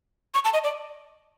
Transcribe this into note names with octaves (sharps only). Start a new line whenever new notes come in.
C#6
A5
D#5
D5